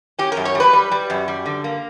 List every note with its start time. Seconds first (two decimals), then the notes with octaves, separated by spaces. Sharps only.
0.19 C#4 G4
0.32 A#4
0.37 F#2
0.45 C#5
0.55 G3
0.60 B4
0.73 G3
0.91 G3
1.10 F#2
1.28 G3
1.46 D3
1.64 A#3